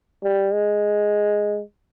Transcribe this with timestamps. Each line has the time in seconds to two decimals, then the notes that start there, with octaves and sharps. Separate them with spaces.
0.23 G3
0.53 G#3